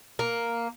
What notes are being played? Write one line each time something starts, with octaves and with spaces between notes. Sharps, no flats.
A#3